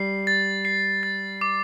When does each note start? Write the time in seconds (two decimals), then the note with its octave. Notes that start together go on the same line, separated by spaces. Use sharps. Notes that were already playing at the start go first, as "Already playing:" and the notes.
Already playing: G3 C7
0.27 A6
0.65 C7
1.03 A6
1.41 D6